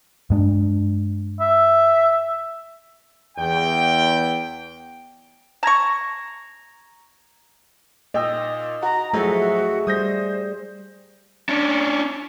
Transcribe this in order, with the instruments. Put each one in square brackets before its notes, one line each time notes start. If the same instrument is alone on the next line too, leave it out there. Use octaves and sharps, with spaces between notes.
[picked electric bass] G2 G#3 D4
[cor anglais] E5
[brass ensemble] E2 G5
[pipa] A5 C#6 [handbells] A#5 G#6 A#6
[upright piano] A#2 G5 E6 [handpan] D#5
[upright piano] F#4 [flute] A#5
[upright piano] F3 F#3 E4 [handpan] A3 G#4 E5 [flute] F#4
[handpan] G3 [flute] C5 [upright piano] D#6 G6 A#6
[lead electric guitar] C#4 D4